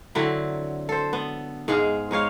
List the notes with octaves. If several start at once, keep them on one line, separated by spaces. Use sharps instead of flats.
D3 F#3 C4 E4
A4 C5
B3
G#2 G#3 G#4 F5
G#3 D#4 C#5 F5